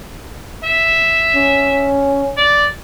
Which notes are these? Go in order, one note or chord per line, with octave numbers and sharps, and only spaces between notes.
E5
C#4
D5